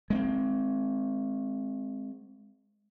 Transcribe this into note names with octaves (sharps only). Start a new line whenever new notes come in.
G#3 A#3 C4